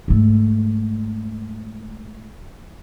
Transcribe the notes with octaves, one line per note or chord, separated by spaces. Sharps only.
G#2 A3